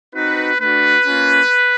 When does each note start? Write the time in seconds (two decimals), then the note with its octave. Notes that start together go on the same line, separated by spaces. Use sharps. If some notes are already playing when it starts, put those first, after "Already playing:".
0.14 C4 D#4 F#4 B4
0.59 A3 D4 F#4 B4
1.05 A#3 C#4 F4